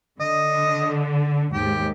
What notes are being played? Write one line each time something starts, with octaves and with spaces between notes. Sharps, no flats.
D3 D#5
D#2 G#2 G4